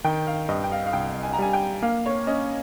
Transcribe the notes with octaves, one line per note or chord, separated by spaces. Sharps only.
D#3 G5
F5
G2 D#5
G5
F5
F5
C2 G5
G#5
A#5
G3 G#5
G5
A#3 F5
C#5
C#4 D#5